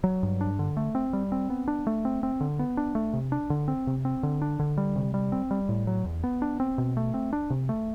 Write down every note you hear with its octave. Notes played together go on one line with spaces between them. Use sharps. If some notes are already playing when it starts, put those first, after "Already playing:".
F#3
G2
D4
D3
A3
C4
G3
C4
B3
D4
A3
C4
C4
D3
B3
D4
A3
C3
D4
D3
C4
C3
C4
D3
D4
D3
G3
C3
G3
C4
G3
A2
F#3
E2
B3
D4
C4
B2
A3
C4
D4
C3
A3